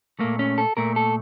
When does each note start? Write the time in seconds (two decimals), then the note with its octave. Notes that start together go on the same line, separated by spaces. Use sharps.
0.19 A#2 A3 A#3
0.39 C#4
0.58 A4
0.77 A#2 A3 A#4
0.96 A4